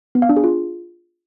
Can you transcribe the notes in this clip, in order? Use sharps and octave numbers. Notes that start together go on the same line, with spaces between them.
B3
F5
D4
G#4
F4